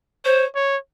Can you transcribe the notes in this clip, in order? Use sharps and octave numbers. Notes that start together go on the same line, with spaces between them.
C5 C#5
C#5